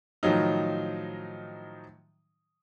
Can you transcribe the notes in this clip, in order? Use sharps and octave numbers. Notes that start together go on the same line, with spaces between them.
A2 D#3 F3 F#3 D#4